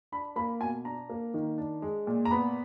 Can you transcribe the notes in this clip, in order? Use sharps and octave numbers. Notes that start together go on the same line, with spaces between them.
D4 B5
A#3 B5
B2 G#5
D4 A#5
A#3
D#3
D4
G#3
A#2
A#5
B3 B5